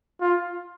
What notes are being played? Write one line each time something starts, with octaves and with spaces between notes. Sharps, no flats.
F4